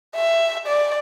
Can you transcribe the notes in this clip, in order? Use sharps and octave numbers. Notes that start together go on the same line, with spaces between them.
E5
D5